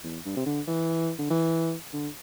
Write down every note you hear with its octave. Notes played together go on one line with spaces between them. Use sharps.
E2
G2
C3
D3
E3
D3
E3
D3